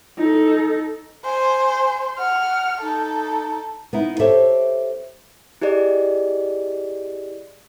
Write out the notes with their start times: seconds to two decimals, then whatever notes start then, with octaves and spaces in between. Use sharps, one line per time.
0.18 D#4 A4
1.25 C5 G#5
2.19 F#5 F6
2.81 D#4 A4
3.93 B3 D#4 E4
4.19 G4 A4 C5 C#5 E5 A5
5.62 E4 G4 G#4 D5 D#5